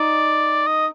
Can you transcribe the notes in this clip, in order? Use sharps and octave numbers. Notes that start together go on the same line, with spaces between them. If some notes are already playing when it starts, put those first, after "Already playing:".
Already playing: D#4 D5
D#5